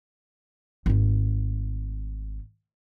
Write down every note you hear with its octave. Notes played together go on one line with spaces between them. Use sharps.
G#1 A3